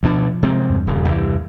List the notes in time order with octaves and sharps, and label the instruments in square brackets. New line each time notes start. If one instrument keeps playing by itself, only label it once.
[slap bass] D2 B2 D4 [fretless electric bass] F3
[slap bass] C3 G#3 C4
[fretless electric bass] E2 G2
[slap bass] D#1 C#3
C2 E3